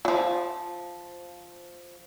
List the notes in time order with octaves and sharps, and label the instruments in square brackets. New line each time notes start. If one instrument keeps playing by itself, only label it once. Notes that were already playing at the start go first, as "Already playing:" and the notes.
[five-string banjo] F3 F#3